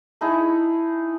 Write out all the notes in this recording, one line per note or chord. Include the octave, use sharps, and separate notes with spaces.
A3 D#4 E4 G#4